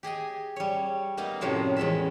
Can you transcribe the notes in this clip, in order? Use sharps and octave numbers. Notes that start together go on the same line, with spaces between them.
G4 G#4 D#5 G#5
G3 C#5
A#3 B3 D#4 D#5
F#2 A2 C3 F3 F#3
E2 G#3 C#4 E5